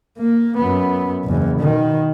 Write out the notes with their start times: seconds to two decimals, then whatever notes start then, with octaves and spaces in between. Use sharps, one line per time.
0.18 A#3
0.57 F#2 B3
1.25 F#1 E2
1.60 B2 D#3